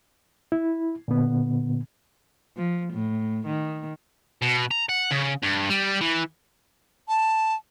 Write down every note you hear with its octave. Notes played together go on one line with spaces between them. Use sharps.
E4
A#2 D3 B3
F3
A2
D#3
B2
A#5
F#5
C#3
G2
G3
E3
A5